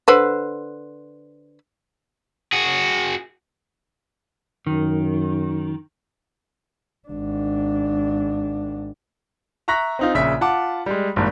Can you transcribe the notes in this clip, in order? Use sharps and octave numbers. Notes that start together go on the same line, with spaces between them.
D3 B4 C5
F#4 G#4
F#2 D#3
G#1 D4
E5 A#5 C#6 F#6 A#6 B6
C4 D#4 F4
A#1 C#3 E5 B6
F4 F#5 A5 D6
G3 G#3
G#1 G2 A#2